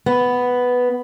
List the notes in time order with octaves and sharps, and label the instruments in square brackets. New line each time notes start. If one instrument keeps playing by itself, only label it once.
[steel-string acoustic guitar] B3